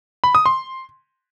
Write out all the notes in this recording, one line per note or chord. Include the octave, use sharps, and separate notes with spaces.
B5
D#6
C6